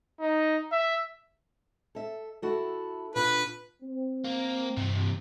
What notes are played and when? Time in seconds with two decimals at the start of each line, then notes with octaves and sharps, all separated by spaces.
0.20 D#4
0.72 E5
1.95 A4 E5
2.42 E4 F#4 A4
3.16 B2 D4 F4 B4
3.83 C4
4.25 A#3
4.77 G2 C3 E3